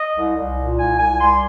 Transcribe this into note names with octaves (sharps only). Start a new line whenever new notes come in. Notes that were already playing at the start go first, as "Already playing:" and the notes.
Already playing: D#5
C2
C2
A#2
C2 G#5
C2 G#5
G3 C6